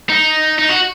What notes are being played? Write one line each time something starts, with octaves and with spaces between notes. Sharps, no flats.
D#4
D#4
F#4